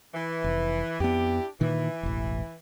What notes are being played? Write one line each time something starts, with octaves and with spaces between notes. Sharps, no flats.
E3
F1
F2 B3 D4 E4 G4
A#2 D#3 E3
E1 A1